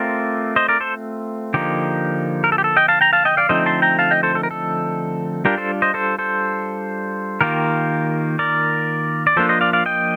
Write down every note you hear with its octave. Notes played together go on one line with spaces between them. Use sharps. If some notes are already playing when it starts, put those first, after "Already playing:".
Already playing: A3 C4 F4 A#4 D5
C5 D#5
A#4 D5
A4 C5
D3 F3 A#3 D#4 G4
A#4
A4
G4
A4
D#5 G5
F5 A5
G5 A#5
F5 A5
D#5 G5
D5 F5
D3 F3 A3 C4 D#4 C5 D#5
A5 C6
G5 A#5
F5 A5
D#5 G5
A4 C5
A4
A#4
A4
G3 D4 F4 G4 A#4
A4 C5
C5 D#5
A4 C5
A4 C5
D#3 A#3 F4 G4 A#4
A#4 D5
D5
F3 A#3 D4 F4 A4 C5
C5 D#5
D5 F5
D5 F5
D#5 G5